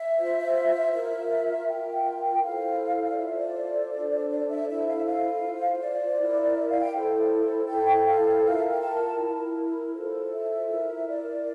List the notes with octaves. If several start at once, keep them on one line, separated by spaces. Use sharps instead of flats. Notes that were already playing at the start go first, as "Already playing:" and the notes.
Already playing: E5
F4 C5
F4 A#4 E5
F4 A#4 G5
E4 A4 C5 F5
D5
F4 A4 C5 E5
D5
D4 A4 C5
D5
E5
E4 A4 C5 E5
F5
E5
F5
F4 C5
D5
E4 A#4
E5
F5
G5
E4 A4 C5
E4 A4 C5 G5
G5
F5
F4 A#4 E5
F5
G5
A5
E4 A#4
F4 A4 C5
E5
E4 A#4
D5